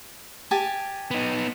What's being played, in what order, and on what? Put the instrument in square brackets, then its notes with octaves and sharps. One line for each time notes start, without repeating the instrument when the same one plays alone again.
[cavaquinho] G4 G#5 A5
[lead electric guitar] B3 D#4